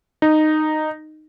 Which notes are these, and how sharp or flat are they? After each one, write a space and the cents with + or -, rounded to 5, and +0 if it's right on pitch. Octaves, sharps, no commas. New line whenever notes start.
D#4 -10